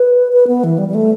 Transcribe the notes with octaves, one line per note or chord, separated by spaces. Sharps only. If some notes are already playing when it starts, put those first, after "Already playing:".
Already playing: B4
B4
B3
E3
G3
G3
A3